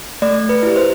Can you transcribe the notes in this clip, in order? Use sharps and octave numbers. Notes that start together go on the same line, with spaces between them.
A3 D5
B4
E4 G4
C5